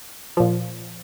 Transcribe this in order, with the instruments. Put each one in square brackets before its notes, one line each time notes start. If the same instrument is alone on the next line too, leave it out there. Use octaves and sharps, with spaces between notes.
[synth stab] A#2 F3